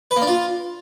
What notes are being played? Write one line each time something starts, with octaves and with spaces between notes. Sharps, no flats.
B4
A#3
D4
F4